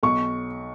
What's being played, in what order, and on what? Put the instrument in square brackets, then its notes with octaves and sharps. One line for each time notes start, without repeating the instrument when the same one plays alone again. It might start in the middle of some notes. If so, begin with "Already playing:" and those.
[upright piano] B1 C#6